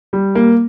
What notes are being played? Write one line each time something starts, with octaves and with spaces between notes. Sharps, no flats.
G3
A#3